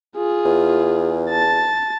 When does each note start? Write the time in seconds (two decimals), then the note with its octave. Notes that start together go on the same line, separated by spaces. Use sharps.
0.17 F4 G#4
0.45 E2
1.30 A5 A6